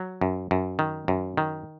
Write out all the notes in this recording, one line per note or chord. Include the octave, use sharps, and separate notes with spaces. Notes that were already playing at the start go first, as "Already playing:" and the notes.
Already playing: F#3
F#2
F#2
D#3
F#2
D#3